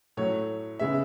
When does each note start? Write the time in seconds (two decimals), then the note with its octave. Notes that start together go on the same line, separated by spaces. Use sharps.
0.17 A2 F#3 A3 C#5
0.79 C#3 G#3 B3 E5